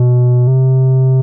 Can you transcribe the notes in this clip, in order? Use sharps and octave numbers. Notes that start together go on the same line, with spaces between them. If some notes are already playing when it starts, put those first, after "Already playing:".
Already playing: B2
C3